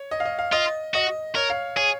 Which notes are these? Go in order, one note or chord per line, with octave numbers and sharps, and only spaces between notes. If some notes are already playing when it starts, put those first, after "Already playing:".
Already playing: C#5
D#5
F5
D#5
F5
F4 D#5
F#4 D#5
A#4 C#5
F5
G#4 C#5